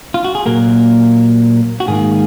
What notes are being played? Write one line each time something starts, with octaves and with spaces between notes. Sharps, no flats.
F4
F#4
G#4
A#2 F#3 A#3 A#4
F#4
G#2 D#3 A#3 G#4